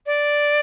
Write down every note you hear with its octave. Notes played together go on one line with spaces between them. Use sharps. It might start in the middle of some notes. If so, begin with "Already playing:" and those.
D5